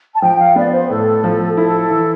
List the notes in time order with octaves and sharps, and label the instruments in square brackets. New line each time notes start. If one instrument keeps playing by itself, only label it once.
[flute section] A5
[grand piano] F3 [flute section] G5
[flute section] F5
[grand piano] B3 [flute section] D5
[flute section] C5
[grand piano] A2 [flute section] A4
[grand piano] F3
[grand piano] E4 [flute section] A4
[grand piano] E3